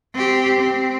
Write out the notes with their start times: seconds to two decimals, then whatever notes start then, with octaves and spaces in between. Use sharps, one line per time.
0.14 C4 G4
0.59 C4